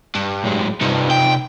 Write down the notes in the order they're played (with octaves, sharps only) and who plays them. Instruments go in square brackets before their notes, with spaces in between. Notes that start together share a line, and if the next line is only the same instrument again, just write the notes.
[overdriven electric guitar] G2
[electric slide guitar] A2 F#3 G#3
[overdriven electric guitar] G2 [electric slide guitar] C3 D#4 F4
[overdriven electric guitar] G5